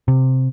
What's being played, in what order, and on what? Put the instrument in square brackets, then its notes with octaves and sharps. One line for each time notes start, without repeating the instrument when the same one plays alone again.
[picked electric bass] C3